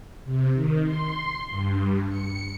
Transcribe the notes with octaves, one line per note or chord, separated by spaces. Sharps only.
C3
D#3
C6
G2
C#7